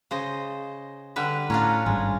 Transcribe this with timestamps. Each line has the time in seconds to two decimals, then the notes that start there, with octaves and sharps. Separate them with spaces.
0.11 C#3 C5 D#5
1.16 D3 G3 B4
1.50 A2 C#4 D4 F4 A#5
1.86 G#1 G2 G#3 G#5